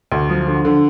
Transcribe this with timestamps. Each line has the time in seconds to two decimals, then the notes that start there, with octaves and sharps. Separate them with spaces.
0.12 D2
0.29 F3
0.47 D3
0.65 D3